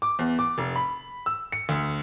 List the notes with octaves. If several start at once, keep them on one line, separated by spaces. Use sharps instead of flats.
D6
E2
D6
F1
B5
E6
C#7
D2